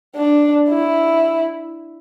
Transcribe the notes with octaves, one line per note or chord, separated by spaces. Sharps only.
D4
E4